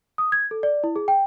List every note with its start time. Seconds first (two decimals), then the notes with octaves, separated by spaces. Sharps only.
0.18 D#6
0.32 G#6
0.51 A4
0.63 D5
0.84 E4
0.96 G#4
1.08 G5